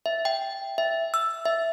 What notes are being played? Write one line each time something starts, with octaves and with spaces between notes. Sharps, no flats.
E5
G5
E5
E6
E5